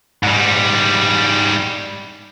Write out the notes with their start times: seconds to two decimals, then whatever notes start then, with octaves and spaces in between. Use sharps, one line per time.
0.23 G#2 G3